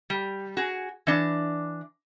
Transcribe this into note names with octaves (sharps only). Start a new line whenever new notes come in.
G3
F#4 G#4
E3 D4